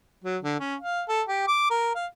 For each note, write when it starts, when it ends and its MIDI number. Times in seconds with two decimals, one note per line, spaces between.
0.24 0.37 54
0.43 0.57 50
0.60 0.76 61
0.81 1.03 77
1.09 1.22 69
1.28 1.46 67
1.48 1.69 86
1.70 1.93 70
1.95 2.06 77